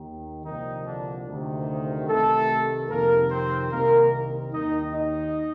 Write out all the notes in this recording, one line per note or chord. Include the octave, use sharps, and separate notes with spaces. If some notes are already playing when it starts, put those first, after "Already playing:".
Already playing: D#2 D#3
C2 A#2 D#3 F3 D#4
D3 D4
D2 C3 D#3
C2 C3 D#3 A3 A4
F2 C3 D#3 A#3 A#4
C4 C5
C2 C3 D#3 A#3 A#4
D#2 D#3 D#4 D#5
D#4 D#5